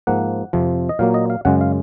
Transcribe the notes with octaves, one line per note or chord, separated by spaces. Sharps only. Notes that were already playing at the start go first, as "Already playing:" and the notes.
G#2 F3 A#3 F#5
F2 C3 F3
D#5
A#2 F#3 A#3 F5
D#5
F5
F#2 C#3 G#3 F#5
F5